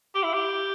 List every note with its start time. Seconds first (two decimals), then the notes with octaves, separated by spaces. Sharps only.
0.14 G4
0.23 E4
0.33 G4